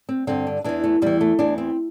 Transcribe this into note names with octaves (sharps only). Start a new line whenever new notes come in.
C4
G2 D3 C4
D4
E2 E3 D4
A3
E2 E3 G3
A3
E2 E3 D4
C4